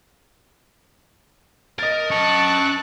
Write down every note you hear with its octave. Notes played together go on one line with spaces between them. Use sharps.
A#4 D#5 A6
C#4 F#5 A5 C#6 F#6